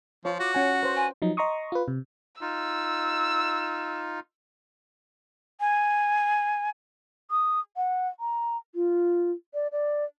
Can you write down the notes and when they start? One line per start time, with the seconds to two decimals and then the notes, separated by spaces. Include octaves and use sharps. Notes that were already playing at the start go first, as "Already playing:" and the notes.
0.25 F3 F4 C#5
0.40 F#4 D6
0.54 C#4 F#5 G#5
0.83 B4 C5
0.96 G#5
1.22 F3 F#3 D#4
1.37 D#5 A#5 C6 C#6 D#6
1.72 F4 B4
1.88 C3
2.41 D#4 F4 E6
5.60 G#5
7.31 D#6
7.76 F#5
8.20 A#5
8.75 F4
9.54 D5
9.72 D5